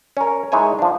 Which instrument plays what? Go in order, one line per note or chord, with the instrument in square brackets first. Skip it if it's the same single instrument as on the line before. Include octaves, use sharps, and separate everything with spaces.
[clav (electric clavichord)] C#4 A#4
G#3 D#4 E4 C#5 G#5
F3 D4